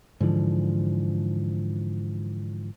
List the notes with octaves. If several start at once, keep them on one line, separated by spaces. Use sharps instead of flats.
G#2 D3 E3 F3